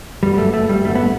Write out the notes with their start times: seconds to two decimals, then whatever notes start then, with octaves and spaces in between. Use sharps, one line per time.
0.22 G1 F#2 D3 F#3 G3
0.38 A3
0.54 A3
0.69 G3
0.85 A1 G2 D3 A3
0.95 B3